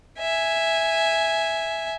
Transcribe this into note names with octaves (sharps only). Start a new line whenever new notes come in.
E5 G#5